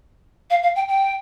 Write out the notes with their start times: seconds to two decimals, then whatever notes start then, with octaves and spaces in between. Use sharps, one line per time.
0.50 F5
0.63 F5
0.76 G5
0.88 G5